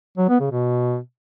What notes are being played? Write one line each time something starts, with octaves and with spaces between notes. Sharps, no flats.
F#3
B3
C#3
B2